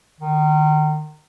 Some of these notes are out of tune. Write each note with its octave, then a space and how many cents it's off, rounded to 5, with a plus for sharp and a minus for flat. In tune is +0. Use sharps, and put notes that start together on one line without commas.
D#3 -30